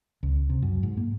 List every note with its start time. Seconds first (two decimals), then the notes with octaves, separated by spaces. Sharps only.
0.23 C#2
0.50 C3
0.63 F#2
0.83 G#2
0.97 A#3